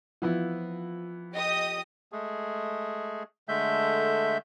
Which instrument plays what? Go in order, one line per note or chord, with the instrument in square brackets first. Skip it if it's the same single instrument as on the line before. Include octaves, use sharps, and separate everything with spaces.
[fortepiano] E3 B3 E4 [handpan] F3 F4
[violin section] G4 D#5 D#6
[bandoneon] G#3 A3 G#4
D3 G#3 A3 E5 G6